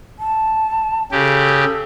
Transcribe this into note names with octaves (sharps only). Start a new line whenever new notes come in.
A5
C#3 G4 A4